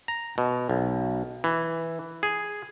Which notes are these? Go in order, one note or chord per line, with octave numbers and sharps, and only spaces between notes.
A#5
B2
B1
E3
G#4